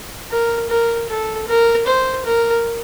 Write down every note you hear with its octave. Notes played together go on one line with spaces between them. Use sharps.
A#4
A#4
A4
A#4
C5
A#4